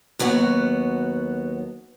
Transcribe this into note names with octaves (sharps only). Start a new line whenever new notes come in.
D#2 F#3 B3 F#4